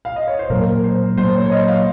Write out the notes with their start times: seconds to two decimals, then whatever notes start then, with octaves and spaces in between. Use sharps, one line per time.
0.05 F5
0.16 D#5
0.28 C#5
0.39 C5
0.50 A#2 F#3 A#3 A#4
0.84 C5
1.17 A#2 F#3 A#3 C5
1.35 C#5
1.46 C#5
1.52 D#5
1.68 F5